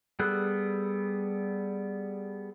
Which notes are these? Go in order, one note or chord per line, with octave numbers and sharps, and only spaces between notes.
G3 B3 G#4 A4 F#6